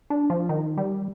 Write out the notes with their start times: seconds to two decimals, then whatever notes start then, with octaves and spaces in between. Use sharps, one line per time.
0.10 D4
0.30 F3
0.49 D#3
0.78 G3